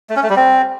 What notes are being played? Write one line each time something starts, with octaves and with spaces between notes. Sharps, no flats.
A3
C#4
A3
G3
C4